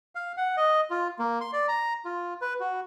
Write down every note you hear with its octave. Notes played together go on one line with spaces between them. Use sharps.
F5
F#5
D#5
F4
A#3
C6
D5
A#5
F4
B4
F#4